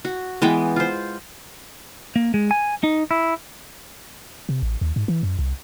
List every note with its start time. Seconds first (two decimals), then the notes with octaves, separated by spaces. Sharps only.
0.05 F#4
0.42 E3 G#3 B3 G5
0.76 F4 C5
2.16 A#3
2.34 G#3
2.51 G#5
2.84 D#4
3.11 E4
4.49 C3
4.63 A1
4.81 D#2
4.96 G#2
5.08 E3
5.23 F#2
5.39 C2